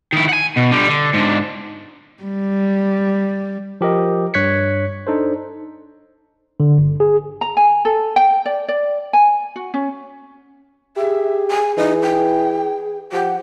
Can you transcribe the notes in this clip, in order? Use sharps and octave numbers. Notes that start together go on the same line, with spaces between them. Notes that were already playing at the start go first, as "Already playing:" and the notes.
D#3 E4
F#5 G#5
B2
D3 G3
D3
G#2 D3
G3
F3 G4 A#4 D#5
G2 C#5 F#6 G#6 B6 C#7
D4 D#4 A4 C5
D3
G1
G#4
A#5
G#5
A4
G5
D5
D5
G#5
F#4
C#4
G4 G#4 E5
G#5
E3 D#4
G5
F3 G4 F#5